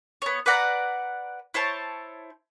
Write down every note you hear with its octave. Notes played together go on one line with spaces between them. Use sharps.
B3 C#5
B4 D5 F#5 A#5
E4 C5 C#5 A5